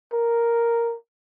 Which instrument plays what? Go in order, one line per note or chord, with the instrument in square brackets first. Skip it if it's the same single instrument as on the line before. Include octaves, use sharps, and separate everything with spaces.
[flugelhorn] A#4